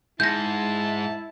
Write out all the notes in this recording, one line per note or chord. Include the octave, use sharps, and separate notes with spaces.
G#2 E4 A5 G6 A#6